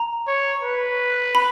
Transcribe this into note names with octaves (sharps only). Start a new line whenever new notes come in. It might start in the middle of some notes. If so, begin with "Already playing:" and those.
Already playing: A#5
C#5
B4
B5